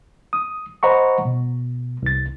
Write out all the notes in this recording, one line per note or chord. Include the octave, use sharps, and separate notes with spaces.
D#6
C5 D#5 F#5 A#5 B5 C#6
B2
C2 A6